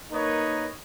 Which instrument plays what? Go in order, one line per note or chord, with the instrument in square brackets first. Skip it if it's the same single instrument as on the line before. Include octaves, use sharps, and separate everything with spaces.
[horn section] A#3 D#4 A#4 B4 C#5 D#5